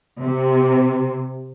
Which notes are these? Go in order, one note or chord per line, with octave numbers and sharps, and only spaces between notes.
C3